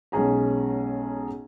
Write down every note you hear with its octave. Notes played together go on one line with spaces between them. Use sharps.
B1 G#3 C#4 G#4 A#5